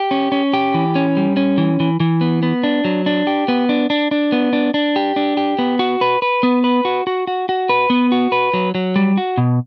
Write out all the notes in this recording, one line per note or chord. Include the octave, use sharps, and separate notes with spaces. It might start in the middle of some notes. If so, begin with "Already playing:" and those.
Already playing: G4
C#4
C#4
G4
E3
C#4
G3
C#4
E3
E3
E3
B3
B3
D4
F#3
D4
G4
B3
D4
D4
D4
B3
D4
D4
G4
D4
G4
B3
F#4
B4
B4
B3
B4
F#4
F#4
F#4
F#4
B4
B3
F#4
B4
F#3
F#3
G3
F#4
B2